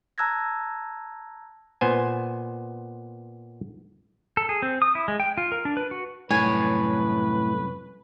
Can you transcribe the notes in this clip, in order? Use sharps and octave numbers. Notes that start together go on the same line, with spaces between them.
A5 A#5 E6 F#6 G#6 A#6
A#2 B3 C5 G#5
A4
G#4
C4
D#6
E4
G#3
G5
F4
A#4
D4
B4
F#4
C2 F#2 A2 B4 C#5 G#5